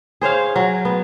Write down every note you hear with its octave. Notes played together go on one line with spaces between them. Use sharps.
G#4 C5 C#5 F5
F#3
B3